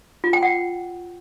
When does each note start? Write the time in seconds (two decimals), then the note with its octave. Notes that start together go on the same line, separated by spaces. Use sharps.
0.24 F4
0.33 G5
0.43 F#5